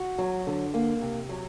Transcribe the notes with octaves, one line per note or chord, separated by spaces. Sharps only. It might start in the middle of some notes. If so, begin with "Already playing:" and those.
Already playing: F#4
F#3
D3
A#3
C3
F#3